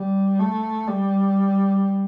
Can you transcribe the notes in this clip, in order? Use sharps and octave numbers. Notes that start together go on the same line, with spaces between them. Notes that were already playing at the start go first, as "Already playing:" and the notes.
Already playing: G3
A3
G3